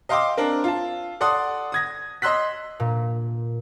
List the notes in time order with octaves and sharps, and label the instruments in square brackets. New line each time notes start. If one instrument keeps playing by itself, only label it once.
[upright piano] D#5 F5 G5 C6 D6 E6
C4 D4 A#4
F4 A5
A4 D5 F#5 C6 D#6
D#6 G#6 A#6
D#5 C6 E6 F#6 B6
[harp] A#2